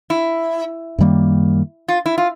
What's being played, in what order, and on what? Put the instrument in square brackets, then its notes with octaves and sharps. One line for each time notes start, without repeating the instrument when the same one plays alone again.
[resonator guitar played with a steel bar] E4
[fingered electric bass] F#2 D#3 G3 A#3
[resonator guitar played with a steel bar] F4
E4
F4